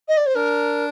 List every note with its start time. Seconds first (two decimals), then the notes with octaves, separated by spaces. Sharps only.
0.08 D#5
0.17 D5
0.26 C5
0.35 D4 A#4